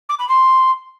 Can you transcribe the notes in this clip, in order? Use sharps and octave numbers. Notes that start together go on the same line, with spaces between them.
D6
B5
C6